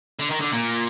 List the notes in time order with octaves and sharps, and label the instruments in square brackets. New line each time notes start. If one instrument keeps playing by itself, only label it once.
[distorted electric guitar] D3
D#3
D3
A#2